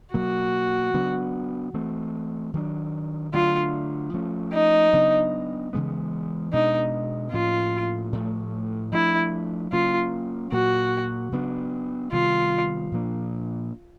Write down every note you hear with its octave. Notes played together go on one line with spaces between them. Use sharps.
B2 F#3 A#3 F#4
C#3 F#3 B3 D4
E3 A3 C4
D#3 F#3 B3 D4
D3 F#3 A3 D4 F4
F3 A3 C#4
D#4
C#3 F#3 B3 D4
C#3 E3 G#3 B3
B2 G#3 B3 D4 D#4
A2 F3 A#3 C#4 F4
A2 F3 A3
F3 A3 D4 E4
C#3 F#3 A#3 C#4 F4
A#2 F#3 A#3 F#4
C#3 F#3 B3 D4
C3 D#3 G3 B3 F4
A#2 F3 A#3 D4